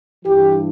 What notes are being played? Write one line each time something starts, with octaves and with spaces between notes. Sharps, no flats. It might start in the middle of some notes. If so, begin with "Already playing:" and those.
G2 E3 G4